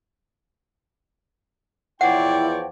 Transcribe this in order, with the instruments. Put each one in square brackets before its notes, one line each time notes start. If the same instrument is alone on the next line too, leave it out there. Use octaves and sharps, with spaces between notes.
[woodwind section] E2 F3 G5 [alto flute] E4 [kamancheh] C#5 D5 [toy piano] F#5